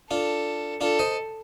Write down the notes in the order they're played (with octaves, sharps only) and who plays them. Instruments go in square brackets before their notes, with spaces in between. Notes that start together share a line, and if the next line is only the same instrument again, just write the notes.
[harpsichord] D4 F4 [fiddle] A4
[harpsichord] D4 F4 [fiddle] A4
[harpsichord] C5 D#5